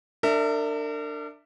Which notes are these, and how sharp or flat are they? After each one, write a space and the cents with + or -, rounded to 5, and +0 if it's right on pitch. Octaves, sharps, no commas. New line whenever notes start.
D4 +15 A#4 -40 E5 +0